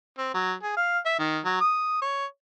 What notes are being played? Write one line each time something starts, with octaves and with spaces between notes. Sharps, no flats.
C4
F#3
G#4
F5
E5
D#3
F#3
D#6
C#5